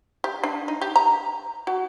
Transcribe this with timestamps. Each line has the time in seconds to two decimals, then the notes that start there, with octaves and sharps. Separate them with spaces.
0.24 G4
0.44 D4
0.68 D#4
0.81 G4
0.96 A#5
1.67 F#4